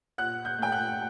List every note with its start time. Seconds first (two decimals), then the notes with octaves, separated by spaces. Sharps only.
0.18 A#2 F#5 F#6
0.45 G6
0.59 A3 G5 G6
0.72 F#5 F#6